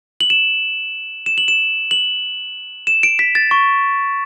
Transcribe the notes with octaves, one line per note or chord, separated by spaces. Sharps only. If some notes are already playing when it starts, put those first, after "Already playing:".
F#7
E7
E7
F#7
E7
F#7
E7
D7
B6
A6
C#6